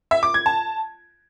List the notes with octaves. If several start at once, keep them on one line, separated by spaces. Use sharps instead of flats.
E5
D6
G#6
A5